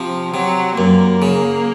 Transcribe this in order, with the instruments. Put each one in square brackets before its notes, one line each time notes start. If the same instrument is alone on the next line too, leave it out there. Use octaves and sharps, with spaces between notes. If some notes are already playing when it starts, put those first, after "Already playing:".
Already playing: [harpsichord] C3 [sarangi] F3
[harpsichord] C3 [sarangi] F#3
[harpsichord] F#2 [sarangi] A#3
[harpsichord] C#3